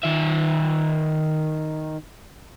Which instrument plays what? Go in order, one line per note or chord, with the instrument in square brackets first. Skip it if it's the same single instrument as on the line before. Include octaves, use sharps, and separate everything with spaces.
[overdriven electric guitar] D#3 E5